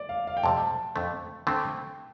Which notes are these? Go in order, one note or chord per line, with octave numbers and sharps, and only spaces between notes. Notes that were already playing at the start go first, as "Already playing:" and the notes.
Already playing: D5
F5
F5
G5
F2 C3 G3 A5
F2 D3 A3
D3 A3 C4 G5